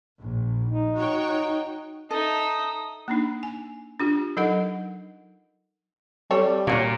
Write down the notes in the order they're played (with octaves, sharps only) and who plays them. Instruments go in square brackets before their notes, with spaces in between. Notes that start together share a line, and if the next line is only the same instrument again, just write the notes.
[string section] A#1
[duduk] D#4
[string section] F#4 C#5 G5
[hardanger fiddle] D#4 E5 [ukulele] A4 [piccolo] D#6
[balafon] A#3 D4 D#4
G#5
D4 F4 G4
F#3 D#4 A4 A#4 D#5 F#5
[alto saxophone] G3 [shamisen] C4 A4 C#5
[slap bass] A#2 [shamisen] F4 F#4 C#5